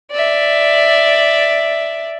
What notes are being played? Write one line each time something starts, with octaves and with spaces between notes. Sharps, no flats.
D5 E5